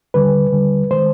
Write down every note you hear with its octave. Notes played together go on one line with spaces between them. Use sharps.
D#2 D3 G3 B4
D#2 D3 G3
D#3 G#3 C5